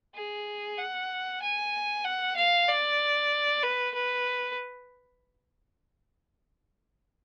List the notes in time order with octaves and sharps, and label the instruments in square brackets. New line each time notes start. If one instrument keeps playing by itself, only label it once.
[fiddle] G#4
F#5
G#5
F#5
F5
D5
B4
B4